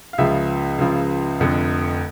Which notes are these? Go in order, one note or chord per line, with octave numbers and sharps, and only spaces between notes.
F5
C#2 C#3 F3 E5
C#2 C#3 F3
F1 F2 D3